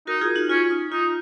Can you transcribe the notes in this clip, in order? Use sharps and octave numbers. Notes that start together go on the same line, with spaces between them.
D#4 F#4 A#4
F4 G#4
D#4 F#4
C#4 F4
D#4
D#4 F4